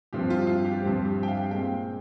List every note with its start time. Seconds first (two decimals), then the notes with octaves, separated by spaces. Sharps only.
0.13 G2 F3 C4 G4
0.30 F4
0.47 F4
0.65 G4
0.81 G2 F3 C4 G4
1.05 G4
1.23 G5
1.28 F5
1.51 A#2 G#3 C4 G5